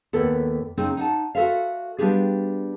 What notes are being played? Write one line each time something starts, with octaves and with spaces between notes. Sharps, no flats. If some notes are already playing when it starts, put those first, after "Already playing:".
D#2 A2 B3 A4
C#3 C4 D#4 G#4
D#4 F#5 A5
F#4 G4 A4 C5 E5 F5
G3 B3 D4 F4 G4 G#4